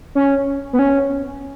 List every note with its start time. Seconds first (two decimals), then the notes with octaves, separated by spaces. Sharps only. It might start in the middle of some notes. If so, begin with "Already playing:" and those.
0.15 C#4
0.73 B3
0.79 C#4